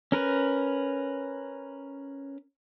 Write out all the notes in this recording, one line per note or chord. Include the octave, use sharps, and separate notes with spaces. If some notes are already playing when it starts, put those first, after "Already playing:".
C#4 A#4 B4